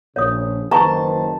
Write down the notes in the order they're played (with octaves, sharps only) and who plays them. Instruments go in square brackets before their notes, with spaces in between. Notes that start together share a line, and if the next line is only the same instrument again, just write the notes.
[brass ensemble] A#1 C#3 [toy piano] C#5 D#6
[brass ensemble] F#1 D#3 C5 [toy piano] B4 A#5 C#6 [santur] A5